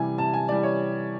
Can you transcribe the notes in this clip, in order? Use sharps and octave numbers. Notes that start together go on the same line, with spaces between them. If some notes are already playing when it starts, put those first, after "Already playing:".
Already playing: C3 E3 G3 G#5
C3 A5
G#5
E3 G3 D5
C#5